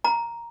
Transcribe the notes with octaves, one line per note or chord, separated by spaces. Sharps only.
A#5